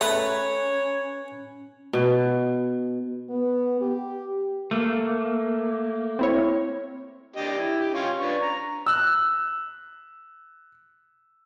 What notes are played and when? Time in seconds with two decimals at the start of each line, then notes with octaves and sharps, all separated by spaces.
0.01 A3 C#4 B4 C#5 A#5
1.93 B2
3.30 B3
3.81 G4
4.71 A3 A#3
6.19 C4 E4 C#5
7.36 D4 G4 D#5
7.58 E4
7.79 G4
7.95 C#4 F4
8.20 D4 B4 C#6
8.42 A#5
8.86 E6 F#6